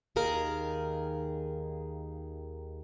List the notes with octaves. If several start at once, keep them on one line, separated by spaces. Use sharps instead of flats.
D#2 D#3 G#4 A#4 F5